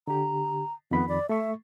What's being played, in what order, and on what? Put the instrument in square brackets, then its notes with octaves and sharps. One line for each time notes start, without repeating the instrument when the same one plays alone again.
[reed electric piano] D3 G4 [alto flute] A#5
[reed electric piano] F2 D#3 B5 [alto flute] B3
[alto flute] D5
[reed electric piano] A3 C#6 [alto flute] E5